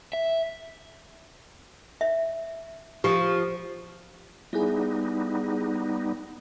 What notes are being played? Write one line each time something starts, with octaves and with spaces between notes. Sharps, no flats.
E5
E5
F3 G4
G3 B3 D#4 E4 G#4